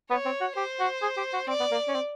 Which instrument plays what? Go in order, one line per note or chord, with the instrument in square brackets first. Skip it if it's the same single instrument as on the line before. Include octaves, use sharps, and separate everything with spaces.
[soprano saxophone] B3 [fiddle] C#5
[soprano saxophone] C4
F#4
[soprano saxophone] G4 [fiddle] C5
[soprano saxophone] F#4
G#4
G4
F#4
[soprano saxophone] C4 [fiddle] D5
[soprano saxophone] B3
A#3
C#4
C4